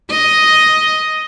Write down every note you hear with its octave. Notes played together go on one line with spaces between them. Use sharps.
D#5